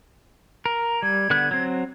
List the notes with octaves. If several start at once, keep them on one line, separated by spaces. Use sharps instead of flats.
A#4
G3 G#6
D3 B3 F#6
F#3 C4